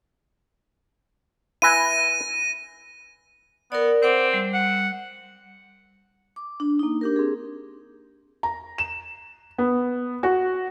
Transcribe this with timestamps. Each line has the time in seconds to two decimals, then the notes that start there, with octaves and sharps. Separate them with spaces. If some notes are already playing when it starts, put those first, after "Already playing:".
1.62 E4 B4 G#5 A#6 D#7
3.72 B3 A#4 D5
4.03 C4 C5 F#5 D6
4.34 G3
4.54 F#5
6.36 D6
6.60 D4
6.79 A#3 D#4
7.01 D4 G4 A#4
7.16 C4 G#4
8.43 A#5
8.78 E7
9.58 B3
10.23 F#4